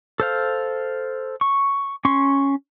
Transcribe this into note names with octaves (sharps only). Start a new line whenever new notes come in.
A4 C5 F5
C#6
C#4 C6 C#6